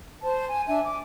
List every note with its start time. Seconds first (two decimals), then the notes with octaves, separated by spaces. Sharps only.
0.23 C5 A5
0.48 G#5
0.66 D4 E5 G#5
0.84 D6